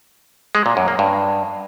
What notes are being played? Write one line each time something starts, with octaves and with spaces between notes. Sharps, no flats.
G#3
A#2
F#2
A#3
G2